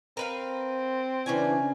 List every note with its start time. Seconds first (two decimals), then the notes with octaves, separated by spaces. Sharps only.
0.17 C4 A#4 B4 F5
1.26 C#3 E3 C#4 D4 G#5